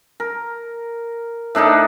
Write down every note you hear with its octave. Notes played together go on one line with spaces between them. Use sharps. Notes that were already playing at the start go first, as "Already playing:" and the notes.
A#4
A2 D4 D#4 A4